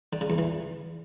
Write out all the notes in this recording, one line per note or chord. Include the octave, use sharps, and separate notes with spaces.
D3
C#3
E2
E3